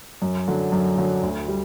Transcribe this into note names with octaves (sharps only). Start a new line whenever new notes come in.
F#2
D3 F#3
F#2
D3 F#3
D2
G3